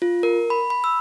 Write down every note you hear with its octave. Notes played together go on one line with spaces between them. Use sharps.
F4
A#4
B5
B5
E6